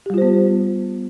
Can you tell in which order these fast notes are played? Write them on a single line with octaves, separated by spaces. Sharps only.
G4 G3 F4 C5 B3